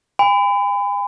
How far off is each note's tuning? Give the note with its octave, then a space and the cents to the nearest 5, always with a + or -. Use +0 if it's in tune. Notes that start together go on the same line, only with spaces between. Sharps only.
G#5 -45 B5 +35